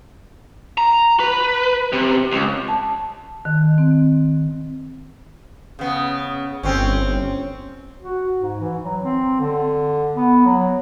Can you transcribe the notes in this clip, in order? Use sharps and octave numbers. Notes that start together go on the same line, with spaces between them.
A#5
B4
C3
C#2
A5
D#3
C4
C#3 B3
G1 C4 C#4
F#4
G#2
E3
F#3
C4
D3
B3
F#3